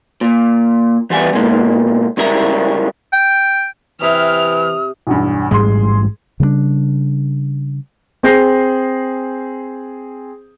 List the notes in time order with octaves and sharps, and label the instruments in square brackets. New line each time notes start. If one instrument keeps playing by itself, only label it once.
[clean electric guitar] A#2
E3 G3 B3 G#5
G#2 B2 G#3 A#3
C#2 C#3 G3 A#4 E5 A#5
[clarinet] G5
[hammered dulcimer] C3 [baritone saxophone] E3 [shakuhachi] D#6 [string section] F6
[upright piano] B1 E2 G2
[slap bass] A1 G#2 G3 [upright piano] G#4 C6
[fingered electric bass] C#3 G3 G#3 D4
[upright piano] C4 G#4 G6 A#6 C7